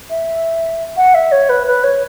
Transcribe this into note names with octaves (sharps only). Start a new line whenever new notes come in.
E5
F#5
E5
C#5
B4
B4
C#5